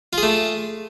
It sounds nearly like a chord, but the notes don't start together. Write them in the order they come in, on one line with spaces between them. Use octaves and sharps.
F4 G#4 A3